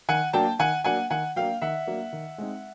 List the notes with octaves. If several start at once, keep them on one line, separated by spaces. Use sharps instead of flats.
D#3 F#5 G#5
F#3 A#3 D4 G5 A5
D#3 F#5 G#5
F#3 A#3 D4 F#5 G#5
D#3 F#5 G#5
F#3 A#3 D4 F5 G5
D#3 E5 F#5
F#3 A#3 D4
D#3
G#3 C4 D#4